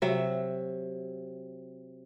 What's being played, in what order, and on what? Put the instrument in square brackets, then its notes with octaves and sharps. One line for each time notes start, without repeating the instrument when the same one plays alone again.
[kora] C3 F#3 E5